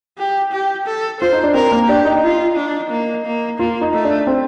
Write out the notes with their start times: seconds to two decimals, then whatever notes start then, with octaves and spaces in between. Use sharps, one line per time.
0.18 G4
0.52 G4
0.86 A4
1.21 F4 C5
1.33 D#4
1.43 D4
1.54 C4 A#4
1.72 A#3
1.88 D4 G4
2.05 D#4
2.23 F4
2.56 D4
2.90 A#3
3.25 A#3
3.59 A#3 F4
3.81 D#4
3.93 A3
4.05 D4
4.27 C4